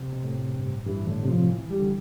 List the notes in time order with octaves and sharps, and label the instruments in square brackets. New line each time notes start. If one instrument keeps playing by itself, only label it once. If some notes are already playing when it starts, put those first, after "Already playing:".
Already playing: [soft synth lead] C3
[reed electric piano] B2
A2
G2
[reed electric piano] G2 [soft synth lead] E3
[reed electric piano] A2 [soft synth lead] D3
[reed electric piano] C3
[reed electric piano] B2 [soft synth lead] F3
[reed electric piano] E3
[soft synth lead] G3
[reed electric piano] D3